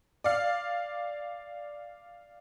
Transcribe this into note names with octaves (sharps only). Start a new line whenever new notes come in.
D5 F5